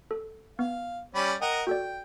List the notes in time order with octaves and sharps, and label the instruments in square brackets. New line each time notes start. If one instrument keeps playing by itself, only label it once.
[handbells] A4
[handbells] B3 [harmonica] F5
[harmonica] G3 C#4 B5
[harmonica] A#4 D#5 F#5 [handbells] G5
[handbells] F#4 A4 D5 [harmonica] G5